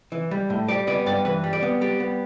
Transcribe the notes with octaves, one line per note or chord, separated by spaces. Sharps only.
E3
G3
A2
G3 D5
B3 D5
G2 D5
E3 B4
G3
D5
B3
G3 G4
B3